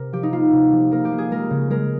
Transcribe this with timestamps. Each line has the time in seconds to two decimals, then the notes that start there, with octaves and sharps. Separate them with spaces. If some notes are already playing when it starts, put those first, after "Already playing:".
Already playing: C3 A#4
0.13 F3 G4
0.23 D#4
0.32 A#3 F4
0.53 C3
0.72 F3
0.91 A#3 A#4
1.05 G4
1.12 A#3
1.18 G#4
1.31 G#3 A#4
1.50 C#3
1.70 G#3 A#4